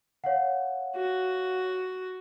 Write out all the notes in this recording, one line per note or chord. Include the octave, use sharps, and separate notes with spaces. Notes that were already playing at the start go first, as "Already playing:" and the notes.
C#5 F5 F#5
F#4